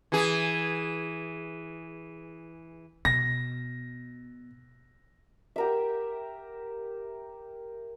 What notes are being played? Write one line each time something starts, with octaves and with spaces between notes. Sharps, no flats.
E3 G#4
B2 A#6
G4 A#4 E5